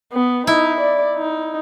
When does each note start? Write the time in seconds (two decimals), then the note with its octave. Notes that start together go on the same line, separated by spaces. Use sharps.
0.13 B3
0.47 D#4 E4
0.80 D5
1.16 D#4